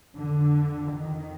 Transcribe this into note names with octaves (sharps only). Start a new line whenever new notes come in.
F2 D3
D#3